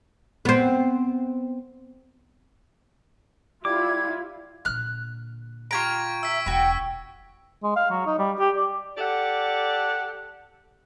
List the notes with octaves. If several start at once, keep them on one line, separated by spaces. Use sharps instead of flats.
B3 C4
G3 E4 F4 D6 G#6
A#2 D3 F6 F#6
F4 G4 A#5 C#6 G#6 D7
E5 E6 B6
E1 F#4 G5 B5
G#3
F5
F#3
D#4
G3
G4
D5
G4 A4 D5 F#5